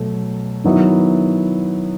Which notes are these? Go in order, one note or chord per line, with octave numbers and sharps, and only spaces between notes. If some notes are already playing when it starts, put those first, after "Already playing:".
Already playing: B2 F#3 A3
D#3 F#3 B3 E4